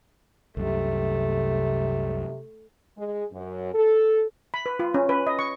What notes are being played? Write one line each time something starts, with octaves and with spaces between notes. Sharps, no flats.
C2 F#2 C3 A3
G#3
F#2
A4
B5
B4
F4
C#4
B4
D#5
C#6